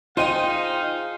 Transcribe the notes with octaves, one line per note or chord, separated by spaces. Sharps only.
D#4 F4 G#4 C5 D#5 F5 G5 D#7